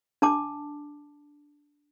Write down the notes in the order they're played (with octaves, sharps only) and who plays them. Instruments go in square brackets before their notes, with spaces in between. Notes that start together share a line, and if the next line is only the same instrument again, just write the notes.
[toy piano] D4 A5 D6